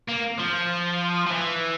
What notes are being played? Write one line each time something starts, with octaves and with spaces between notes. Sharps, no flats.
A#3
F3
F3
E3